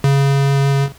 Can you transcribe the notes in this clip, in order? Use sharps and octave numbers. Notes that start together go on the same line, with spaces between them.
C#3